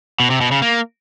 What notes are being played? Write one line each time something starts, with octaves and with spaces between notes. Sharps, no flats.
B2
C3
B2
C#3
A#3